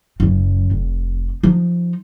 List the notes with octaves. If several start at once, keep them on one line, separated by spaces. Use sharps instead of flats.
F#1 F#2
F1
F3 D#4